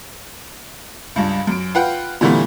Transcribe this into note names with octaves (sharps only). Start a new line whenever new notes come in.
C#2 G2
F#2 D7
F4 B4 F#5 G5
A#2 D3 E3 G3 A3 B3